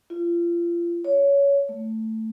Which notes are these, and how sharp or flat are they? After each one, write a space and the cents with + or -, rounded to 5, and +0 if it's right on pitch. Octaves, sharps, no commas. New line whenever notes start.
F4 -30
C#5 +15
A3 +10